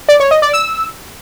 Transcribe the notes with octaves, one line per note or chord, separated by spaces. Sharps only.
D5
C#5
D#5
D5
E6